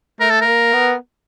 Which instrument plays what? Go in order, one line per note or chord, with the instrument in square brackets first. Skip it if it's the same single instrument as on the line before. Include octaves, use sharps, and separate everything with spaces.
[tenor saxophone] A3 [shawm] A#4
[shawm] A4
A#4
[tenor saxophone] A#3
B3